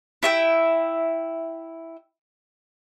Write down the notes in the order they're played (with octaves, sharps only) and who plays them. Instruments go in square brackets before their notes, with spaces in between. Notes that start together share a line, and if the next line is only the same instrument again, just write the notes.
[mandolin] E4 E5 G5